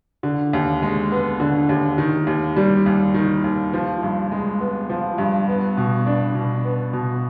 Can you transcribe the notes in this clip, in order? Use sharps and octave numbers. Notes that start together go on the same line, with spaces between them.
D3
D#2
G#3
B3
D3
D#2
D#3
D#2
G3
D#2
D#3
D#2
F3
G2
G#3
B3
F3
G2
B3
B2
D4
B2
B3
B2